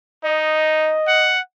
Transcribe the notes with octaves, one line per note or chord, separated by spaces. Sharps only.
D#4 D#5
F#5